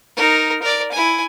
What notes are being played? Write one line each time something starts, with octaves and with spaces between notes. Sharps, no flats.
D#4 A#4
A#4 D5
E4 G#5